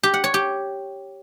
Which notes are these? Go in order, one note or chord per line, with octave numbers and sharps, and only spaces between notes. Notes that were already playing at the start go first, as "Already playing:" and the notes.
G4
F#5
C#5
G4